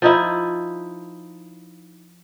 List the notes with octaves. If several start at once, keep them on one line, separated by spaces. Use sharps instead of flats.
F3 D#4 E4